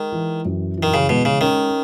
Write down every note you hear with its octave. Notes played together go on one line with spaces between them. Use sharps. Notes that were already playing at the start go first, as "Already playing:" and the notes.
Already playing: D#3 G#3
E3
F#2
E3
D#3
C#3
B2 G#3
C#3
D#3 C#4